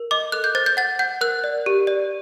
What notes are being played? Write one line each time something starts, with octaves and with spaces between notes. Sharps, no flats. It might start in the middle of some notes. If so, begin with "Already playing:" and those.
Already playing: A#4
D#5 D6
A4 F#6
G6
C5 A6
G6
F#5 A6
F#5 G6
A#4 F#6
D5
G4
D5